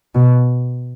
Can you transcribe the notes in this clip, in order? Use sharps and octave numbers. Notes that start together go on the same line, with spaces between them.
B2